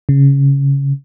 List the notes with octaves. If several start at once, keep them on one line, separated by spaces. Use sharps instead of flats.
C#3